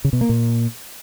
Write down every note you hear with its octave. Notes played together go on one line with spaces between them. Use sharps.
C#3
B2
A#3
A#2